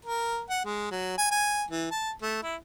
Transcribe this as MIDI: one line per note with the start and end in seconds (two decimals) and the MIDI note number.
0.05 0.41 70
0.50 0.61 78
0.65 0.88 56
0.91 1.15 54
1.18 1.28 80
1.31 1.64 80
1.70 1.87 52
1.91 2.11 81
2.22 2.40 57
2.43 2.56 64